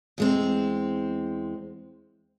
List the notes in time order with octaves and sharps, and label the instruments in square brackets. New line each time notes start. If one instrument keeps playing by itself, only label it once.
[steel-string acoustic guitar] E2 G#3 C4